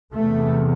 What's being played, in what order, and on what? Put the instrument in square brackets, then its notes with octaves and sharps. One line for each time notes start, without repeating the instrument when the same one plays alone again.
[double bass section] E2 C3 A3